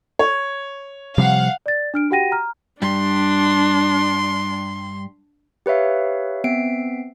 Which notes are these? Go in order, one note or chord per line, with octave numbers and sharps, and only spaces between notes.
C#5
C3 F3 G3 F5 F#5
D5 A6
D4 F6 D7
F#4 G4 F#5 G5 A#6 D#7
A#5 F6
G2 G3 D4 C6
G4 B4 C#5 E5 F5
B3 C4 E5 C7 D7